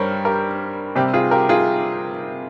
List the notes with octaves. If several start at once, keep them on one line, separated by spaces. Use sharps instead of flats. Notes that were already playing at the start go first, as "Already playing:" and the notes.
Already playing: G2 G3 A#4 C5 C#5
G4 A#4
C3 G3 C4 G4
F4 G#4
G4 A#4
F4 G#4